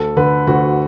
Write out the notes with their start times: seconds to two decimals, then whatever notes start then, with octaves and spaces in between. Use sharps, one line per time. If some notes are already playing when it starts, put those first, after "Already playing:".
Already playing: D2 A4
0.16 D3 B4
0.47 D2 F#4